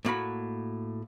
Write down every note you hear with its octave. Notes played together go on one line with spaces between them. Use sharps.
A2 A#3 F#4 B5